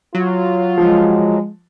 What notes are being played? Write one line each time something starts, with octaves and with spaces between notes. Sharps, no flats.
F#3 F4
F3 G#3